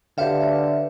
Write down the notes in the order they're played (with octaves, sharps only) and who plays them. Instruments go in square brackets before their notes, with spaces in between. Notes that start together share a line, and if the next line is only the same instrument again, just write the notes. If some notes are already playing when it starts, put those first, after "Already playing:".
[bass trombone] D3 [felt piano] G4 F5 [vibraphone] B4 C#5 E5